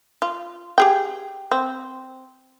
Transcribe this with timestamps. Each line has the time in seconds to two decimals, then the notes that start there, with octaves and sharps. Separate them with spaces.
0.22 F4
0.78 G4 G#4 G5
1.51 C4